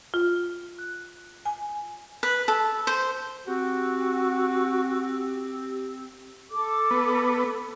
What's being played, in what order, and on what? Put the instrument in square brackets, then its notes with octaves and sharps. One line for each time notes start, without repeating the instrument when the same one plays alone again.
[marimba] F4
F#6
G#5
[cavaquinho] B4
A4
C5
[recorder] C4 [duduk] F#4 [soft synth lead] G4
[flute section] A4 D6
[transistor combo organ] B3